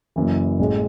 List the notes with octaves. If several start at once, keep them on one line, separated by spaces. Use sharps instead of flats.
F#1 F#2 E3
A1 A2 G#3